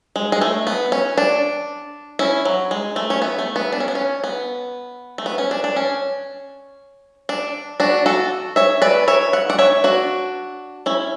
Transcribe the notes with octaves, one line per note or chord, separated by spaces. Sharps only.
G#3
G#3
A3
B3
C#4
D4
C#4 E4
F#3
G#3
A3
C#4
B3
A3
B3
D4
C#4
B3
C#4
B3
A3
B3
C#4
D4
D4
C#4
D4
D4 F#4
F#4 A4
C#5 E5
B4 D5
C#5 E5
F#5
D5 F#5
C#5 E5
D4 F#4
C#4 E4